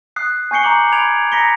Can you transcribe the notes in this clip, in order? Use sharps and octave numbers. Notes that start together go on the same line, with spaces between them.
D#6 F#6 C7
G#5 C#6 G6 C7 C#7 G7
A#5 C#6 D6 F#7 G7
B5 G#6 D7 F7
A#5 D#6 A#6 B6 C#7 G7